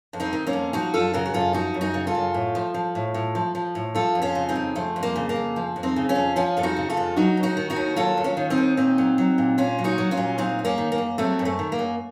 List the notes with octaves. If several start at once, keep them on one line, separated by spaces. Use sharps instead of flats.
F2
C4 D#4
D#3
A#3 C#4
F2
F3 D#4 F#4
F#2 F4 A4
C#3 F#4 A#4
F#4
F#2 F4 A4
F3 D#4 F#4
F#2
D#4 F#4
C#3
F4 A4
F#2
A2
F3
F3
A2
A2
F3
F3
A2
F3 F4 A4
F2
C#4 F4
C#3
C4 D#4
F2
F3 A3
F2
A#3
C#3
A#3
F2
F3
F2
C4 D#4
C#3
C#4 F4
F2
F3 C#4 F4
F2 A4
D#4 F#4
C#3
F4 A4
F2
F#3 D#4 F#4
D#2
D#4 F#4
D#3
D#4 F#4
D#2
F#3 F4 A4
D#2
C#4 F4
D#3
C4 D#4
D#2
A#2 C4 D#4
F#3
F#3
A#2
A#2 C#4 F4
F#3
D#4 F#4
F#3
C#4 F4
A#2
F#3 C4 D#4
F#2
A#3 C#4
D#3
A#3
F#2
F#3 A3 C4
F#2
A3
D#3
A#3
F#2